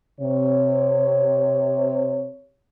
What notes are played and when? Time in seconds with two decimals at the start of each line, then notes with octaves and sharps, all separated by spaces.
0.21 C3 C#5